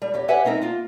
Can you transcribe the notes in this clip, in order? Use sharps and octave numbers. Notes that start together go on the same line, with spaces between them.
G3
E2 G4 C#5
G4 B4 C#5 E5 F#5 G#5
G#3 C4 D#4 A#4 E5
A#3 F4